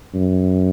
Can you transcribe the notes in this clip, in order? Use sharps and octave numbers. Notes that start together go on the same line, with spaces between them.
F#2